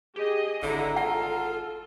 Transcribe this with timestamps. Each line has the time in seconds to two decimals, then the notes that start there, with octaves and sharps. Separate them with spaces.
0.16 G4 G#4 D#5
0.63 G#1 D3 E4 A#5
0.96 F4 A4 F#5